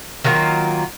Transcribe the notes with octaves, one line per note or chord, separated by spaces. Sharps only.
D#3 F#3 A#3 F4